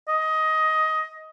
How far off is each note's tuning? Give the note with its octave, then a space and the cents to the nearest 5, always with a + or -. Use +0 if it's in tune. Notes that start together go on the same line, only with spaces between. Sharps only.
D#5 +15